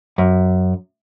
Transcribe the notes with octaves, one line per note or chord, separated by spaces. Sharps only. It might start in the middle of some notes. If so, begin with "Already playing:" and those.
F#2